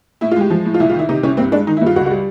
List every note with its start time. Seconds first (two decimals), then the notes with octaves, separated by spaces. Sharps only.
0.21 A2 E4
0.31 F4
0.36 G#3 G4
0.50 F3
0.65 A2
0.74 F4
0.80 C2 E4
0.89 F4
0.94 D#3 E4
1.09 C3 D#4
1.23 C2 C#4
1.37 G2 C4
1.52 G#3 D4
1.67 D#3 D#4
1.77 E4
1.81 G2
1.86 F4
1.96 C#2 F#4
2.06 F#4
2.10 G3